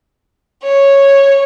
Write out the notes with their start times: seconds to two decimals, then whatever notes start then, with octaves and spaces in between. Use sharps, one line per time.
0.63 C#5